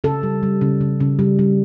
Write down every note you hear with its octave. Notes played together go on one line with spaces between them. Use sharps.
C#3 A4
G3
G3
C#3
C#3
C#3
G3
G3